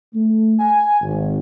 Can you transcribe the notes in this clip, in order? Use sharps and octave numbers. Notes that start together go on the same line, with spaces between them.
A3
G#5
G#1